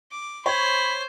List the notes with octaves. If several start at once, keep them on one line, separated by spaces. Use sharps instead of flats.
D6
C5 C#5 B5